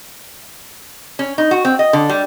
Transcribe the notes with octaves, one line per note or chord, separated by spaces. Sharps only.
C#4
D#4
F#4
C4
D#5
D3
G3